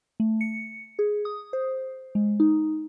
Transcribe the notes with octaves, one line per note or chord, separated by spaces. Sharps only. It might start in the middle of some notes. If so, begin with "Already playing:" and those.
A3
C#7
G#4
D#6
C5
G#3
D#4